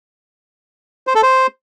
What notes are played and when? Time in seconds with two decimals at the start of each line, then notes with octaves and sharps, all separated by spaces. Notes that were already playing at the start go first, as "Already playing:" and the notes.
1.07 C5
1.15 A4
1.23 C5